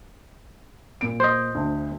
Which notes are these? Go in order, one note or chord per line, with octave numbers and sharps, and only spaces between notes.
A#2 D7
C5 D#5
D2